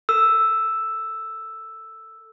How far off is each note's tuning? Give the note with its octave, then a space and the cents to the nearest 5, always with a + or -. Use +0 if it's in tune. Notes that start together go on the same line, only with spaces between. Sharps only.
A4 +20 E6 +0